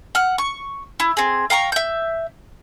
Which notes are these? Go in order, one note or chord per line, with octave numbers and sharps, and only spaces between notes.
F#5 F6
C#6
E4
C4 G#4
F5 G5 A#5 C#6
E5 G6